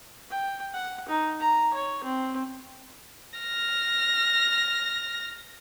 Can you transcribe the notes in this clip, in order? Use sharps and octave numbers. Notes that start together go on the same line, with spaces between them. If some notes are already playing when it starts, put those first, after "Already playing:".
G5
F#5
D#4
A#5
C#5
C4
F6 A#6